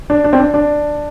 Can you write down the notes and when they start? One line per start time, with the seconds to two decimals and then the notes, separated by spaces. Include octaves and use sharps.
0.10 D4
0.24 D4
0.33 C4
0.39 D4
0.54 D4